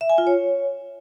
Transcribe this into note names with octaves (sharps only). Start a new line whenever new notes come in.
E5
G#5
F4
C#5